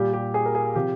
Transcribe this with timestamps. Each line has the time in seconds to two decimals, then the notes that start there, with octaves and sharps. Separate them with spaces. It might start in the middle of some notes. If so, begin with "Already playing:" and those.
Already playing: A#2 G3 G4
0.13 G4
0.34 G#4
0.46 A#4
0.55 G#4
0.76 C3 F3 G4